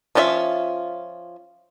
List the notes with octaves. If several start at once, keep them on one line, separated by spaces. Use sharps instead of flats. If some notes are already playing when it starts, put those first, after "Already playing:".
F3 C#4 F4 G#4 E5